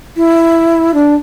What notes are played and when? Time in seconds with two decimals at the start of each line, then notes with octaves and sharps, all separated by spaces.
0.17 E4
0.94 D4